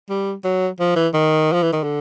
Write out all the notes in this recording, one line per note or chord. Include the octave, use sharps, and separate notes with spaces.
G3
F#3
F3
E3
D#3
F3
E3
D#3
D3